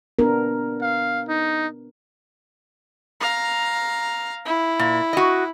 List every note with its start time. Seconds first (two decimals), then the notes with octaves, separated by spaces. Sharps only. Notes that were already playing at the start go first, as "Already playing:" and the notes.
0.19 B3 D4 A#4
0.82 F5
1.28 D#4
3.20 F5 A#5
4.45 E4
4.79 A#2
5.13 F#4 D#5